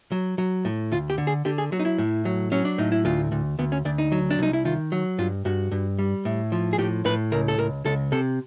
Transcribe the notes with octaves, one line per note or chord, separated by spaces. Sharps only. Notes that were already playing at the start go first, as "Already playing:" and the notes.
F#3
F#3
A2
D2 F4
G4
D3
G#4
D3 G4
G#4
F#3 F#4
D#4
E4
A2
F#3
F#3 C#4
D4
A2 D#4
E4
D2 F4
D2
D2 B3
C#4
D2 D4
D#4
F#3
D4
C2 D#4
E4
D#3 F4
F#3
G2 F4
G2 F#4
G2
G3
A2
F3
G#4
A2 G4
A2 B4
C#2 A#4
A4
C#2 A#4
C#2 A4
C3 A4